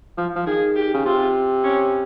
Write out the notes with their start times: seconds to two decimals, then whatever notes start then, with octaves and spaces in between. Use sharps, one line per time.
0.17 F3
0.35 F3
0.46 D#3 G#4
0.76 G4
0.94 C#3
1.05 C3 F4
1.64 C#4